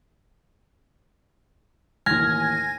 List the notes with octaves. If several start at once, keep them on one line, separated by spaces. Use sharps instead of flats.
A1 D#2 G#5 F6 G#6 A#6